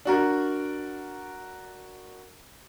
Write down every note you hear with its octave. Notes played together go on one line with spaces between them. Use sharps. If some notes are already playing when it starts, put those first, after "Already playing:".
D4 F#4 A#4